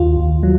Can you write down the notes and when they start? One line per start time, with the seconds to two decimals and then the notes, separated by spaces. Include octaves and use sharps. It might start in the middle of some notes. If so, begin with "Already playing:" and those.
Already playing: D#2 F4
0.17 D#2
0.43 F#3